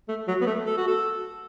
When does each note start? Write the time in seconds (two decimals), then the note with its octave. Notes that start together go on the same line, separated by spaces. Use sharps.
0.09 A3
0.28 F#3
0.41 B3
0.47 A3
0.66 A4
0.77 F#4
0.88 A4